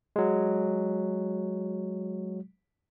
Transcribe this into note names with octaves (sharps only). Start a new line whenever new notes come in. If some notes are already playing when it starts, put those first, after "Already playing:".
F#3 G#3